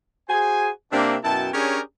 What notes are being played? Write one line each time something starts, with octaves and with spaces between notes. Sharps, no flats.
F#4 G#4 C5 G#5
C3 A#3 C4 D4
F#2 B2 E4 G5 A5
C#4 D4 G4 G#4 A#4 C#5